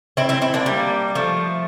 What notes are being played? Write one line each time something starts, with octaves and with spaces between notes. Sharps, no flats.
C4 E4
C4 E4
C4 E4
A#3 D4
G3 A#3
F3 A3